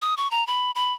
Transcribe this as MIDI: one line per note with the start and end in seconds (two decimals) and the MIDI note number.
0.02 0.14 87
0.17 0.30 85
0.31 0.46 82
0.47 0.71 83
0.75 0.93 83